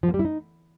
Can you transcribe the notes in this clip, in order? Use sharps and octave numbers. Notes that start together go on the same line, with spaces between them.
F3
A#3
G3
E4
D#4